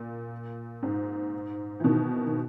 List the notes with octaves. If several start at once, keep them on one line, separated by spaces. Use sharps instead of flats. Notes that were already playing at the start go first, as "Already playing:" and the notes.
Already playing: A#2
G#2
E3
B2 D#3
D#3